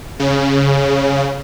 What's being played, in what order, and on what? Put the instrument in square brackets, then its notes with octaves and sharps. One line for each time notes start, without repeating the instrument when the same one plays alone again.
[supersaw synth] C#3